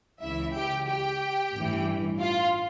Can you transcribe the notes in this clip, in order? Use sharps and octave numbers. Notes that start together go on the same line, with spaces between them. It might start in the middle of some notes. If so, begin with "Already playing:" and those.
C#2 C#3 E3 E4 E5
G4 G5
G4 G5
A1 G2 E3
F4 F5